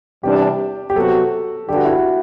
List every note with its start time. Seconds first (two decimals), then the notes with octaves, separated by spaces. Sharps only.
0.23 E2 C3 G3 D4 G4
0.90 G4
0.95 C3 F#3 B3 F#4 A4
1.68 G2 D3 G3 G4
1.76 F#4
1.85 E4
1.92 F#4